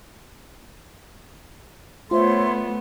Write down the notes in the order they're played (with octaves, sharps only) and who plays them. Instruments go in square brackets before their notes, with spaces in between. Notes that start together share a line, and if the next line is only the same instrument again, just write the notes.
[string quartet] A3 B3 [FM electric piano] F4 [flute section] C5 C#5 E5 [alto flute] C6